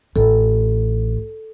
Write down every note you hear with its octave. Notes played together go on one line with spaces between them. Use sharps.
A1 F4 A4